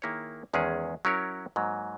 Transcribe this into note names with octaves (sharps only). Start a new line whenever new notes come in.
D#3 A#3 E4 G#4 C#5
E2 D#3 G#3 C#4 G#4
F#3 C#4 E4 A#4 C#5
G#2 F#3 A#3